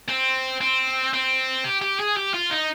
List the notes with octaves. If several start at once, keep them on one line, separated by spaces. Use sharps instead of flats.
C4
C4
C4
G4
G4
G#4
G4
F4
D#4